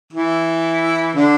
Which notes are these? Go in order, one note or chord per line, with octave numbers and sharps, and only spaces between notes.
E3 E4
D3 D4